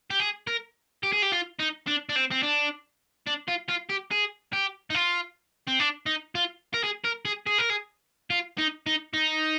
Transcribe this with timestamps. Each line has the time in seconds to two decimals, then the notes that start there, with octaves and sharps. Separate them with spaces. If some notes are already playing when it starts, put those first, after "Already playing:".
0.10 G4
0.20 G#4
0.47 A#4
1.03 G4
1.13 G#4
1.22 G4
1.32 F4
1.59 D#4
1.87 D4
2.09 D4
2.16 C4
2.31 C4
2.43 D4
3.27 D4
3.48 F4
3.69 F4
3.89 G4
4.11 G#4
4.53 G4
4.90 D#4
4.95 F4
5.67 C4
5.79 D4
6.06 D#4
6.35 F4
6.74 A#4
6.83 G#4
7.04 A#4
7.25 G#4
7.47 G#4
7.59 A#4
7.70 G#4
8.30 F4
8.58 D#4
8.86 D#4
9.14 D#4